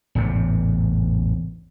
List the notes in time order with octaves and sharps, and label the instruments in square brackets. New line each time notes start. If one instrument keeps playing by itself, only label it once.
[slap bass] A1 E2 G#2 C3